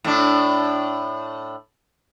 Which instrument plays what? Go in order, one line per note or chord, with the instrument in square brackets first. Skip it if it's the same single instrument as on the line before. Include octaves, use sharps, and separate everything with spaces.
[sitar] A2 D4